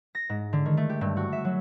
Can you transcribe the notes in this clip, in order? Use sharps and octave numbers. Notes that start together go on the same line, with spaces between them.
A#6
G#2
D3
D#3
A3
G4
G2
F#4
E5
F#3